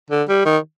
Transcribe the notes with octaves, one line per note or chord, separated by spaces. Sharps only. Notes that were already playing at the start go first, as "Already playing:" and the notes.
D3
G3
D#3